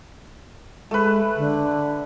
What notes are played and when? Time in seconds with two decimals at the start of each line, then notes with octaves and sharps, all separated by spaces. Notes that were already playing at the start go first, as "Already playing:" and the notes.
0.91 G#3 A3 B4
1.37 D3